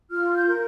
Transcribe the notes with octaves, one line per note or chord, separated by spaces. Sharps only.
F4 F6
G6
A#4